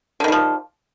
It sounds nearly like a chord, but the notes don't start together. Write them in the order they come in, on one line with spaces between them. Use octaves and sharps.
D3 D#3 G3 F3